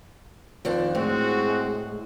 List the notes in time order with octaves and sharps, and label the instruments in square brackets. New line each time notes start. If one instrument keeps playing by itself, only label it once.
[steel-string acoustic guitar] F2 D#3 D4 [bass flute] C5
[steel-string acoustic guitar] A2 [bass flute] G#3 [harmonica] C4 [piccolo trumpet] F#4